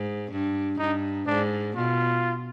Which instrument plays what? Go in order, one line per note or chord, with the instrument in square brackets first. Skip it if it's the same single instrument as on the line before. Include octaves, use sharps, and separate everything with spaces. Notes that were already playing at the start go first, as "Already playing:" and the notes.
Already playing: [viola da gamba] G#2
G2
[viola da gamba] G2 [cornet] D#4
[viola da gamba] G#2 [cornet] D4
[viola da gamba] B2 [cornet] F4